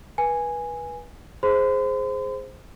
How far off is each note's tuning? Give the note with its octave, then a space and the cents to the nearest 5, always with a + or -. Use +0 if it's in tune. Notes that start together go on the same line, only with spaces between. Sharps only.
B4 -25 G#5 -5
G#4 +0 C5 +0 C6 -45